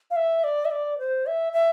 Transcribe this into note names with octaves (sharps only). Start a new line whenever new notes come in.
F5
E5
D5
E5
D5
C5
E5
E5